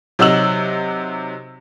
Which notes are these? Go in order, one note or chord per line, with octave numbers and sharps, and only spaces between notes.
C3 F#3 D#4 F#4 E6 F#7